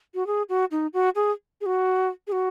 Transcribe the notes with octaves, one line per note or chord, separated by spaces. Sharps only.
F#4
G#4
F#4
D#4
F#4
G#4
G#4
F#4
G#4
F#4